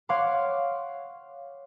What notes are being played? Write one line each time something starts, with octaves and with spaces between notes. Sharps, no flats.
C#5 F5 F#5 C6 D6